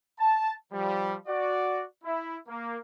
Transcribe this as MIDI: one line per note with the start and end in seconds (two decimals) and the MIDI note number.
0.19 0.52 81
0.72 1.16 53
0.72 1.16 55
1.27 1.84 66
1.27 1.84 74
2.04 2.37 64
2.48 2.77 58